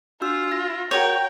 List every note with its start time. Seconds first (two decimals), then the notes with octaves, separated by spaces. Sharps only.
0.21 D4 F4 F#4 E6
0.52 A#6
0.91 F#4 A#4 C#5 G5 G6